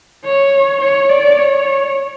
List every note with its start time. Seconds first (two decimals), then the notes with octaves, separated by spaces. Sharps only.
0.25 C#5
0.81 C#5
1.09 D5
1.38 C#5